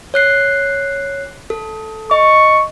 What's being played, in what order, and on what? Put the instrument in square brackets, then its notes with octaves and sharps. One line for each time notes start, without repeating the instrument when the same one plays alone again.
[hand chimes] C#5 F#6 C7
A4
[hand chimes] D#5 [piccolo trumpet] C#6